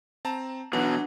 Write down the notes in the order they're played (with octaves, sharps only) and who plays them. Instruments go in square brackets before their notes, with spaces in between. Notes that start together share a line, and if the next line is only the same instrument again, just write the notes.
[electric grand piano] C4 A5 A#5
[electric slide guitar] B2 F#3 [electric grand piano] E3 [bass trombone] B3 [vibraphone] D4